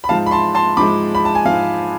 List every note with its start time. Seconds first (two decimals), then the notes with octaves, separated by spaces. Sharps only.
0.04 B5
0.09 G#2 F3 G#3 F5 A5
0.26 B5
0.31 A5 C6
0.55 A5 C6
0.77 G#2 F3 G#3 B5 D6
1.15 B5
1.25 A5
1.35 G#5
1.45 G#2 F3 G#3 F5